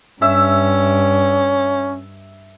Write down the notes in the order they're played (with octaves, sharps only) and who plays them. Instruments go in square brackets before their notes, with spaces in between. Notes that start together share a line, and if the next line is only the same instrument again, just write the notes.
[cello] G2 [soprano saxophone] C#4 [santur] E5